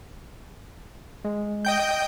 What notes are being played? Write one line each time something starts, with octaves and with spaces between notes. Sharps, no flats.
G#3
D#5 G5 G6